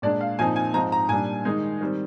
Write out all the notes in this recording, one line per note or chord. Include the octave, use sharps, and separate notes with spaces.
A#2 G#3 D4 D5
F5
A#2 F3 C4 D#4 G#5
G#5
G#2 F3 C4 D#4 A#5
A#5
A#2 G3 D4 G#5
D#3 G#3 D#4
D#3 G3 C4